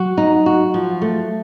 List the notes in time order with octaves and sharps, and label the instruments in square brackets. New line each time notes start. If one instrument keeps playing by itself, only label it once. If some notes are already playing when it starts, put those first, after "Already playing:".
Already playing: [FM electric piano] F#3 [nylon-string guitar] F#4
[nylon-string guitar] D#4
F#4
F3
A3